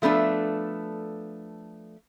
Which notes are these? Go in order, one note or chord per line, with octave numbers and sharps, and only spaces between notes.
F3 A3 B3 D4 A4